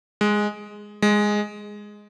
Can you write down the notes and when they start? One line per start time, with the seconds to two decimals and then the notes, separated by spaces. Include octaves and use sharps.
0.21 G#3
1.02 G#3